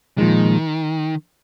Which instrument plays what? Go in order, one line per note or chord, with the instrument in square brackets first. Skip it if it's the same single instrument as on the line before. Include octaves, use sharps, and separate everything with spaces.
[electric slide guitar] A#2 F3 G#3 [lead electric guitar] D#3